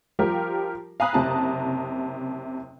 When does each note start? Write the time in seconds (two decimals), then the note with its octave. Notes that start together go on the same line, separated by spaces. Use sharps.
0.19 F3 G3 F4 G4 A#4
1.00 F5 G#5 A#5 B5 D#6 F#6
1.13 F#1 C3 A5 A#5